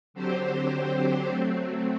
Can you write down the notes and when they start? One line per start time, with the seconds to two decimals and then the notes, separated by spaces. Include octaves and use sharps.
0.14 D3 F#3 C4 G4 C5
1.27 F#3 A3 C4